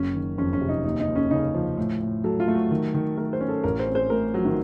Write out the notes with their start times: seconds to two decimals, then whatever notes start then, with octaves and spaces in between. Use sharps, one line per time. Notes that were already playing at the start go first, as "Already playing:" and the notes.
Already playing: F#1 F#3 C#4
0.15 D#3
0.38 F2 C#4
0.53 C#4
0.61 C3
0.69 D#4
0.84 D#2 D#4
1.01 D#4
1.08 D#2
1.15 C#4
1.31 C#3 D#4
1.54 F3
1.78 A2
2.01 A2
2.24 F#3 A4
2.40 F4
2.48 A3
2.55 F#4
2.71 D#3
2.94 D#3
3.17 A3 A#4
3.33 C5
3.41 C#4
3.49 A4
3.64 A1 A#4
3.79 C5
3.87 C4
3.95 C5
4.10 A2 A#4
4.34 F3 F#3
4.45 D#3